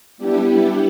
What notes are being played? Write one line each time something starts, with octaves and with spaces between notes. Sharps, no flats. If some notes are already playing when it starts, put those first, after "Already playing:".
G3 B3 D4 E4 G4